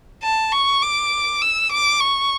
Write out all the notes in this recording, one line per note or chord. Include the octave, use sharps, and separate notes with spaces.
A5
C#6
D6
E6
D6
C#6